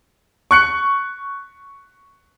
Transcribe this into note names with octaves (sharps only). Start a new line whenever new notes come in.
C#6 F#6 C#7